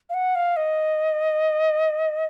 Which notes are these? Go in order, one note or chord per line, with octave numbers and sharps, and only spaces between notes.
F5
F#5
F5
D#5